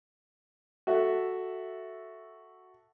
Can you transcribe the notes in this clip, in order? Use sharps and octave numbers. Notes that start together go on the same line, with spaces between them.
F#4 A4 E5